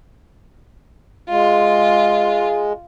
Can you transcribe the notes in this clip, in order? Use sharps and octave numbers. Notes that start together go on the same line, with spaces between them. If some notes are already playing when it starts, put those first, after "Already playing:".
G#3 F4